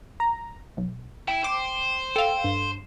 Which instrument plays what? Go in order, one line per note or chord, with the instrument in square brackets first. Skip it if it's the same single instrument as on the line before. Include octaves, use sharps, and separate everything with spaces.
[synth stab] A#5
B1
[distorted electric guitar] E4 [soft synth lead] G5
[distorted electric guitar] C5 [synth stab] D6
[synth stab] A4 F5 [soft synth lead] G5
[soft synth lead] G2